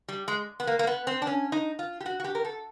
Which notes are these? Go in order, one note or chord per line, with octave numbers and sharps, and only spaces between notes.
G3
G#3
B3
A#3
A#3
B3
C4
D4
C#4
D#4
F4
G4
F#4
F#4
G4
A#4
A4